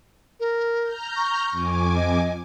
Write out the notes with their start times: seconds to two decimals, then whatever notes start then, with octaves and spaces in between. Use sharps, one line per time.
0.40 A#4
0.82 A#5 F6 G6
1.16 C#6
1.52 F2 G#5 D6
1.96 D#5